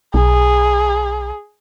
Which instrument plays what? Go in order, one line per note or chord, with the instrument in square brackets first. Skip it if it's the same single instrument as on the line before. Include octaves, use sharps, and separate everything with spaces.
[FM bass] B1 [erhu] G#4